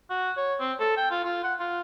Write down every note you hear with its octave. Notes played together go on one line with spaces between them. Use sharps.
F#4
C#5
C4
A4
G5
F4
F4
F#5
F4